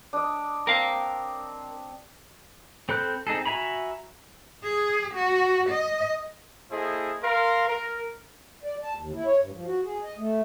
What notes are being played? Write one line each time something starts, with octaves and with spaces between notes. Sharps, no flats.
D4 D#5
C4 A#4 F5
C4 A4 B5 F#6 G6
C4 D#4 G#4 A4
F#4 E5 G#5 A#5 B5
G#4
F#4
D#5
A#3 E4 G#4 A4 C5 D#5
A#4 F5 C6
A#4
D5
A5
D#2
E4
C#5
G2
F3
F#4
G#4
D#5
A3